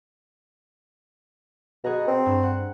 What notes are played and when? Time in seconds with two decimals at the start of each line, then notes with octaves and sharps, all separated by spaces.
1.84 B2 G#4 F#5 A#5
2.08 C4
2.26 G2
2.43 F#5